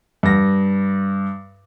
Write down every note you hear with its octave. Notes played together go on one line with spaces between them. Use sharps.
G2 A#6